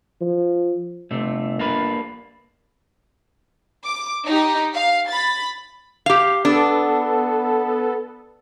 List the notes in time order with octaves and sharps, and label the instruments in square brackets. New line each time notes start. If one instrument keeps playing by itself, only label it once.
[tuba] F3
[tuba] G1 [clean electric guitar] C3 A3
[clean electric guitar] A#3 D4 B4
[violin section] D6
D#4 G4
F5
B5 A6
[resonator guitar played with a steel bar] G4 F5
[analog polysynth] B3 A4 [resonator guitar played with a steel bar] D4